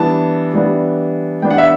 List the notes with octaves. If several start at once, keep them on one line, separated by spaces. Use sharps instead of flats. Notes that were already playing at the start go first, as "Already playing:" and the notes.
Already playing: E3 G3 B3 D4 A5
E3 G3 B3 D4
E3 G3 B3 D4 G5
F#5
E5